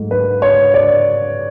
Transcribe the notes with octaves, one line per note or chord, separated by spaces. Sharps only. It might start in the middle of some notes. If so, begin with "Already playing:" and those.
Already playing: G#2 F#3 A3
B4
C#5
D5